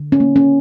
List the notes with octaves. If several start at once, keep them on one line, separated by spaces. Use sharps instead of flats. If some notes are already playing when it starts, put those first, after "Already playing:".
Already playing: D3
C#4
A#3
C#4